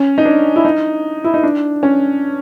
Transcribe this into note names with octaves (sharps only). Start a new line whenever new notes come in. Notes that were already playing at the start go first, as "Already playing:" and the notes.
Already playing: C#4
D#4
D4
E4
D#4
E4
D#4
D4
C#4